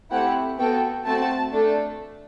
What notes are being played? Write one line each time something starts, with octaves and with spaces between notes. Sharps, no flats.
A3 C4 E4 G4 F#5
B3 F#4 A4 G5
A3 C4 F#4 A5
A3 D4 A4